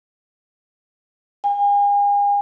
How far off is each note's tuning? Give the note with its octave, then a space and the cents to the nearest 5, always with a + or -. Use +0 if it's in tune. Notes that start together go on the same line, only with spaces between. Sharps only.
G#5 -40